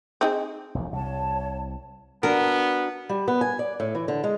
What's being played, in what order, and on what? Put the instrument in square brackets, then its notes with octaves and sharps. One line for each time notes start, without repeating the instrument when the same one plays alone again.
[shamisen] C4 D#4 G#4
[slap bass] E1 A#1 D#2
[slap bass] C2 C3 [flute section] C#5 A5
[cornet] B3 [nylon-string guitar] D4 F#4 [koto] A#4
[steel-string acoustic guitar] G3
B3
G#5
D5
A2
E3
D3
G#3